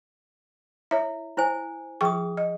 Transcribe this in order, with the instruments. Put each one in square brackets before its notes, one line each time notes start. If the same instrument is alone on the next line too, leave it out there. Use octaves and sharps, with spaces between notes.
[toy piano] E4 [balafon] C#5 E5
[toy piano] E4 C5 G#5
[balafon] F3 G5 C#6 [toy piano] G#4 D#6
[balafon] D#5